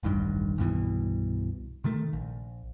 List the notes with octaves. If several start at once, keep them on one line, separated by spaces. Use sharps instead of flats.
E1 A1 G2 D#3
C2 G2 B2 E3
C3 D#3 A3
A#1